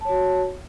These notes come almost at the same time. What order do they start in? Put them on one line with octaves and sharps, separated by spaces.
A5 C#5 F#4